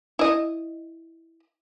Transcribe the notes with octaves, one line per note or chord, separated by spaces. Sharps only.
E4 D#5